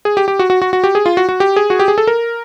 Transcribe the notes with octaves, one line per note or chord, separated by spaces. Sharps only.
G#4
G4
G4
F#4
F#4
F#4
F#4
G4
G#4
F4
F#4
F#4
G4
G#4
F#4
G4
G#4
A4
A#4